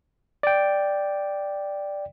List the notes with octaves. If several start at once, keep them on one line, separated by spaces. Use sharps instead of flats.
D5 G5